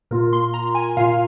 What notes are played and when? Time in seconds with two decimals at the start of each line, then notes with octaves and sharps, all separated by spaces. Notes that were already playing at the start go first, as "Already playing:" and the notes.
0.11 A#2 A#3 F4 A#4
0.33 C6
0.54 A#5
0.75 G#5
0.97 A#2 A#3 F4 F5